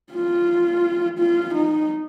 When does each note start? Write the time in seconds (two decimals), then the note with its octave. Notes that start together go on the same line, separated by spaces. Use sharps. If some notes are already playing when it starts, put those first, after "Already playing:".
0.13 F4
1.19 F4
1.55 D#4